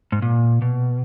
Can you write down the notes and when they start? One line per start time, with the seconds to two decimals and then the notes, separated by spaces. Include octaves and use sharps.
0.12 G#2
0.22 A#2
0.62 B2